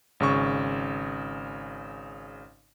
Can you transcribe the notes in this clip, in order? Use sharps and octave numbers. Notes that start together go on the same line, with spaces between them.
G#1 C#3 C#6